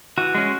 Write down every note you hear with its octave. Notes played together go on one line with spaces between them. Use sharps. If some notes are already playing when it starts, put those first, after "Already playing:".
E3 F#4
G#3 C#4